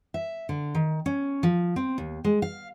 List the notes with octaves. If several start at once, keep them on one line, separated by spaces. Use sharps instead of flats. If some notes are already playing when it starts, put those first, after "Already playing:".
E5
D3
D#3
C#4
F3
C4
D#2
G#3
F5